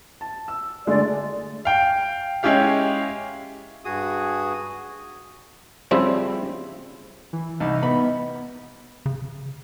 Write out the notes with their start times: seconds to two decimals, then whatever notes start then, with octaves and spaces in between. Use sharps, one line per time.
0.21 A5
0.48 E6
0.87 D3 G#3 A3 D5
1.65 F5 G5
2.43 G#3 C#4 E4 G4 F5
3.85 G2 F#4 G#4 D#6
5.91 C#3 F3 G3 C4 E4
7.33 E3
7.60 C2 D#4
7.83 B3 B5
9.06 C#3